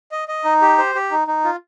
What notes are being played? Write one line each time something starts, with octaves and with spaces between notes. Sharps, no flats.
D#5
D#5
D#4
G4
C5
G4
D#4
D#4
F4